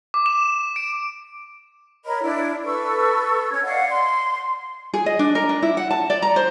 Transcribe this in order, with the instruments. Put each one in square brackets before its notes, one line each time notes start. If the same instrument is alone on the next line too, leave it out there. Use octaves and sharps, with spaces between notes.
[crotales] D6
E7
D7
[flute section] A#4 C#5 D#5 B5
D4 E4 D5
A4 B4 C#6 E6
C#4 G#6
D5 D#5 F5 F#5
C6
[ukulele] G#4
D#5
D4
A#4
D4
E4
F#5
A5
D5
A#5
C5